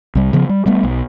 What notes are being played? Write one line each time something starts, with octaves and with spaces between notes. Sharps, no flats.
C2 G3
C#3 F3 B3
G3
G3 A3 B3
B1